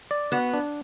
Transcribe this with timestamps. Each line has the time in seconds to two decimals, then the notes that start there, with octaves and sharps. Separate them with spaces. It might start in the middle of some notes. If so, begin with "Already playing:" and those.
0.11 D5
0.32 B3 F#4
0.54 D4